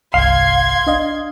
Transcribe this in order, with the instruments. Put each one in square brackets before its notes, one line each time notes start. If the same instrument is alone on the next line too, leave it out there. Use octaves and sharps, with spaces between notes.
[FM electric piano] G1 C2 [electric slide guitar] F5 [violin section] C6 G#6
[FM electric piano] D4 D#5 F5